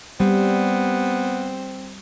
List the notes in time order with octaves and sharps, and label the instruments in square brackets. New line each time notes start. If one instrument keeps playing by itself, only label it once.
[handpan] G3 [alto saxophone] B3 [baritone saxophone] C4